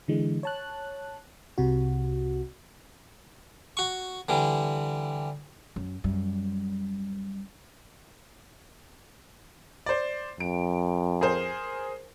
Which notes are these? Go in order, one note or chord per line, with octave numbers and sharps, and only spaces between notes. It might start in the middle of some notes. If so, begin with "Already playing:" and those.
D3 E3 G#3
C#5 A5 F#6
C2 C3 F#4
F#4 C#6
D3 E3 G3
F#2
F#2 G3
C5 D5
F2 D7
G#4 A#4 C5